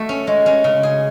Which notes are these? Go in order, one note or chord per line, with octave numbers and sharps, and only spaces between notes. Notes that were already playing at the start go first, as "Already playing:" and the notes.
Already playing: A3 F#4
C#4
G#3
C#4
C#3
G#4